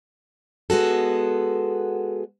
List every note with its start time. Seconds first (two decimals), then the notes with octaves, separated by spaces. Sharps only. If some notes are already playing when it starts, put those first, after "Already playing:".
0.70 G#3 B3 F#4 A4